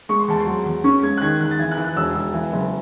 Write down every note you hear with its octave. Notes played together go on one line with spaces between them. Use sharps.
G#3 C#6
C6
E2 A5
C6
F#3
E2
C#4 C#6
G#3 G#6
F#6
D#3 G#6
E2 F#6
A6
E3 G#6
F#6
E3
F#6
E1 E6
E1 E6
E3
F#1